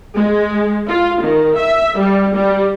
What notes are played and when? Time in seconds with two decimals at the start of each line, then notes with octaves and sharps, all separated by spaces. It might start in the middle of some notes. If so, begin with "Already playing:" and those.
0.15 G#3
0.88 F4
1.22 D#3
1.57 E5
1.98 G3
2.34 G3